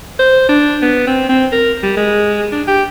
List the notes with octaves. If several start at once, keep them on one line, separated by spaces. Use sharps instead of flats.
C5
D4
B3
C4
C4
A#4
G3
G#3
D4
G4